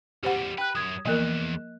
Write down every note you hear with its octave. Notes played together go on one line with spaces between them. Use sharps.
E2 G3 G4 C5 F#5
B4 G5 F#6
F#2 D#6 G#6
B1 E2 F3 A#3 A#4 D#5 F#6